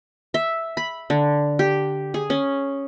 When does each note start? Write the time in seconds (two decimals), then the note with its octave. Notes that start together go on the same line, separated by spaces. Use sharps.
0.34 E5
0.77 B5
1.10 D3
1.59 G4
2.14 G#4
2.30 C#4